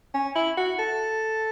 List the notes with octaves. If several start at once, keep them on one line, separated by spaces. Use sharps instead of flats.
C#4
E4
F#4
A4